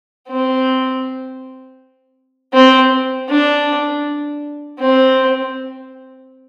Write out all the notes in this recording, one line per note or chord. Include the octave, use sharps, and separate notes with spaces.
C4
C4
D4
C4